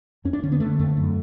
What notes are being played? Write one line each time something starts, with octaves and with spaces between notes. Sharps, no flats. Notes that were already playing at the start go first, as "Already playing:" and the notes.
F2 C#4
D4
D3 C#4
B3
D3 A3
F2 A3
F#2